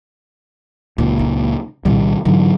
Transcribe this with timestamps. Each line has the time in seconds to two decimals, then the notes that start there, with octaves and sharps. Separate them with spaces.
0.98 C#2 A#2 D#4
1.19 D#4
1.85 C2 A#2 D#3 G3 E4
2.25 G#2 D3 E3 F#3